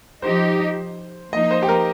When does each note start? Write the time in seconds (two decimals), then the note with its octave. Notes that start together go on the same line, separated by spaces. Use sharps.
0.22 F3 D#4 G4 C5
1.32 F3 A#3 D#4 D#5
1.51 C5
1.62 G4
1.69 A#4